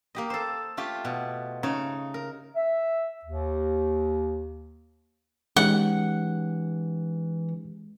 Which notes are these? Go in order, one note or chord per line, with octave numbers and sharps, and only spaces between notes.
A#3 G4 D#5
A4 C5
A3 F4 G4
B2
C#3 D#4 C#5
A#4
E5
D#2
E3 G#3 C#4 D#4 G4 F#5